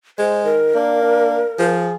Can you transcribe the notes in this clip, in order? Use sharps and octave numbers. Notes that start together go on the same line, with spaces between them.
G#3 C5
D#3 A#4
A#3 D4
D4
F3 G#4